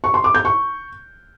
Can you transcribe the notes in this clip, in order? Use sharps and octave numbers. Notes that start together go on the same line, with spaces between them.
C#6
C6
D6
G6
C#6